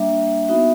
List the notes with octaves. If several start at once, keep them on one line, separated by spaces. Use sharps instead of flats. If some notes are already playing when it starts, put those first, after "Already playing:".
Already playing: G3 A#3 D4 E5
B3 D#4 F#4 E5